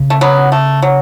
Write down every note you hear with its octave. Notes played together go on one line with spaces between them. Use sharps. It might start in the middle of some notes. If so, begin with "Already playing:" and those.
Already playing: C#3
A3
F#3 B3
A3
F#3